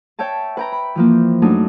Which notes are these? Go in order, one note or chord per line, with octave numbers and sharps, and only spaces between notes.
C#5 E5 G5 A5
B4 G5 A#5
B5
E3 F3 A#3
F#2 A3 D4 D#4